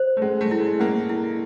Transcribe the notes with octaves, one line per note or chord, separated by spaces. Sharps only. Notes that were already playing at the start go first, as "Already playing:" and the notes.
Already playing: C5
A3
G#3 C#4
A3
E4
G#3
A#3 C#4
E4